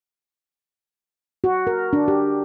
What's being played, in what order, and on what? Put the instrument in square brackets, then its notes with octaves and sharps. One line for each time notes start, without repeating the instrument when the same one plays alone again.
[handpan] F#4
A#4
D4
G4